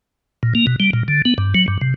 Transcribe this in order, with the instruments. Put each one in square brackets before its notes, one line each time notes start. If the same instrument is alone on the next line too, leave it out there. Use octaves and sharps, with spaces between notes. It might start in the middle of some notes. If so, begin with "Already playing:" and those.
[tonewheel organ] A#2
A#3
B2
G3
A#2
D3
B3
G2
F#3
G2
C3